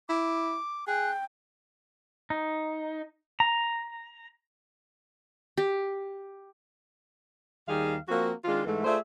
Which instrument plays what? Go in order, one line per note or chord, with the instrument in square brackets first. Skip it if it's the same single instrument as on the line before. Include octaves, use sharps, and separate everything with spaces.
[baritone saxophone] E4 [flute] D6
[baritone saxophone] G#4 [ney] G5 [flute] F#6
[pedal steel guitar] D#4
A#5
[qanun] G4
[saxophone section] D#2 D#3 G3 G#4 F5
F3 A#3 C4 F#4
D#3 G#3 D4 F4
G#2 E3 A3
A3 F4 G#4 C5 D5 E5